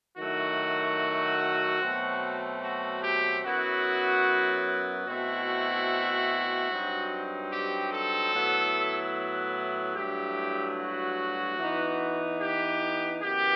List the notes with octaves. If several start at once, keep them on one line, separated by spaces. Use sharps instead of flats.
D#3 F#3 A3 E4 F#4
B2 F#3 A3 C4
F#4
G4
F#2 F#3 B3 E4 F#4
B2 A3 C4 E4 F#4
G2 F#3 C4 D#4
G4
A4
A2 F#3 B3 E4
G2 F#3 A3 E4 G4
F#4
E3 B3 D#4
G4
F#2 E3 B3 G4